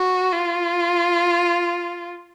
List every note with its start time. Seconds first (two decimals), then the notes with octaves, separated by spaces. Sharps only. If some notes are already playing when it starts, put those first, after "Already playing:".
Already playing: F#4
0.32 F4